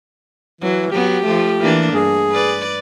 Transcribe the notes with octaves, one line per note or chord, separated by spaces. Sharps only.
E3 F#3
F#3 B3 G4
F3 A3
E3 A#3 D4
G2 G#4
B4 D5